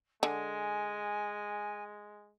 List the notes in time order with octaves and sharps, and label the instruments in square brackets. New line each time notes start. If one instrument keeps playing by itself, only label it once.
[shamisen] D3 [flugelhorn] G#3 [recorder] G#5